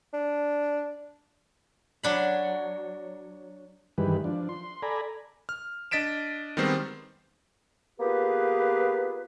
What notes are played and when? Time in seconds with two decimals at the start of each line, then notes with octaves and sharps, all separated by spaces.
0.13 D4
2.03 F#3 D4 B5
3.98 G2 D#3 E3 G3 G#3 B4
4.24 F3 D4
4.49 C6
4.82 A4 D5 G#5 A#5 B5
5.49 F6
5.91 D4 D#5 A6 B6 D7 E7
6.57 D#3 G3 G#3 B3 C4 C5
8.00 A#3 B3 F4 G4 G#4 B4